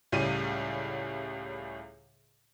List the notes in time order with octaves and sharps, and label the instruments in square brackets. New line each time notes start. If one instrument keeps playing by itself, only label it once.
[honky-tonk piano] C#2 A2 G3 C#4 D#7